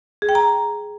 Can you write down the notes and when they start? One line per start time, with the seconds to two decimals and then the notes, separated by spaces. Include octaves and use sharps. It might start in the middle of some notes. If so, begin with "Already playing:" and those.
0.22 G#4
0.29 G5
0.35 A#5